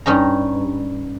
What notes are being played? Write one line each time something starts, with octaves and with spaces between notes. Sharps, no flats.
G2 C#4 D#4 A#5